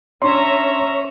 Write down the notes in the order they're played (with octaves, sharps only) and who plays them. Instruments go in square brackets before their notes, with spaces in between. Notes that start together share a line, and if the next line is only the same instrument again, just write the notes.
[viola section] C#4 E5 A#5 [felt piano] D4 C6 [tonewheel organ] C#5